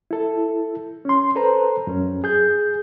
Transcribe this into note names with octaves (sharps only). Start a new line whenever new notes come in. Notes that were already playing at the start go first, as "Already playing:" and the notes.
E4 A4
C#4 C6
A4 B4 C5 A#5
F#2 C#4
G#4 G6